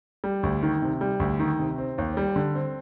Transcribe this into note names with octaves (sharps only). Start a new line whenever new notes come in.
G3
D2
D#3
C3
G3
D2
D#3
C3
C4
D#2
G3
D3
C4